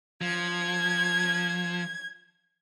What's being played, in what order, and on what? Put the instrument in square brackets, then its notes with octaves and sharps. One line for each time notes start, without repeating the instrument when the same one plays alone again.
[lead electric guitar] F3 [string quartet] G#6